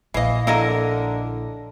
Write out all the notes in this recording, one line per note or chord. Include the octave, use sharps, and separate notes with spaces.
A#1 E3 D#5 F5
D3 F#3 D#4 E4 A#4 D#5